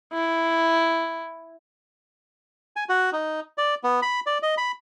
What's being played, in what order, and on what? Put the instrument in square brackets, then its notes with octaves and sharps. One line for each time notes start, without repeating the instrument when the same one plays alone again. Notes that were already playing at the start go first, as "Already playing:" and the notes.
[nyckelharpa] E4
[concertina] G#5
F#4
D#4
D5
B3
B5
D5
D#5
B5